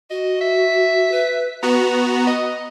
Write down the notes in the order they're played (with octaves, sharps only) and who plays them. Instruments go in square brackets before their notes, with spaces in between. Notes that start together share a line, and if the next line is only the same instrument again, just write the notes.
[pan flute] F#4 [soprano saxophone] D#5
[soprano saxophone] E5
[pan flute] B4
[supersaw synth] B3 F#4 [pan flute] B4 [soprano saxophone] A#5
[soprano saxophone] D#5 [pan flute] D#6